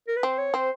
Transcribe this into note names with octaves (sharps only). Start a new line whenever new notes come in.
A#4
B4
C4 C5
C#5
C4 C5